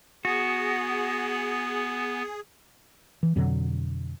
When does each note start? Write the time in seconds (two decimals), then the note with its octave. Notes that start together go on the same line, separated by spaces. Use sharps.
0.25 B3 F#4 G#4
3.23 E3
3.36 F2 B2 D3 F#3